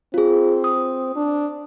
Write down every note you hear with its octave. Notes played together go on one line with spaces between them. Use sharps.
C4 F4 G#4
D#6
D4